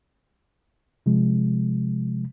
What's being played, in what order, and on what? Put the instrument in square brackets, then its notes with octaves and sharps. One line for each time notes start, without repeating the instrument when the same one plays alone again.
[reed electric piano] C3 F3 G#3